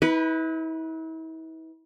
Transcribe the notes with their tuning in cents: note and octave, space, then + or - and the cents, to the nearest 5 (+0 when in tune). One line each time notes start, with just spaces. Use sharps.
E4 -40 B4 +0